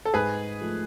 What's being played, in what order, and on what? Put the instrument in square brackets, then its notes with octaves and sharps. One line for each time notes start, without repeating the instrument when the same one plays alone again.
[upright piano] A4
[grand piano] G#2 [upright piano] G#4 B4
[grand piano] F3 A3